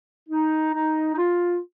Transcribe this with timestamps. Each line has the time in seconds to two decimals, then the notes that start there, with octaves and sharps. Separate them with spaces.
0.29 D#4
0.74 D#4
1.14 D#4
1.18 F4